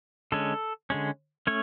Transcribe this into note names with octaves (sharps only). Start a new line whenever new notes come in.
D3 G#3 C#4 A4
D3 G#3 C#4
A3 C#4 C#5